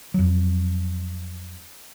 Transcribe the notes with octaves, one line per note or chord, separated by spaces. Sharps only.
F2 F#3